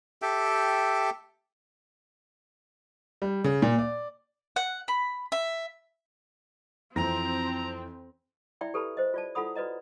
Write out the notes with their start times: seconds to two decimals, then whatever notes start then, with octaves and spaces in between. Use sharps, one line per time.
0.22 G4 A4 E5 G5
3.22 G3
3.44 C#3
3.62 A#2
3.79 D5
4.56 F#5
4.88 B5
5.32 E5
6.96 F2 E3 C4 A#5 A#6
8.61 E4 D5 E5 G5 B5
8.74 G4 A4 B4 A5 B5
8.97 C5 D#5
9.14 F4 D5 A5
9.35 E4 F4 A4 F#5 B5 D#6
9.56 F#4 B4 D5 D#5 A#5